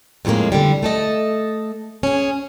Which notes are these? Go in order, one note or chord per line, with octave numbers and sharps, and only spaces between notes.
F2 A2 F3 G#3 A#3
D3 G3
A3 A4 D#5
C#4 G#4